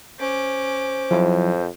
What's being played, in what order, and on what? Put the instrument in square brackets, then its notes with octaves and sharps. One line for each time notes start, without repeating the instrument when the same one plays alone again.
[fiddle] C#4 D6 [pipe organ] C5
[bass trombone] F2 [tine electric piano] F3 F#3 E4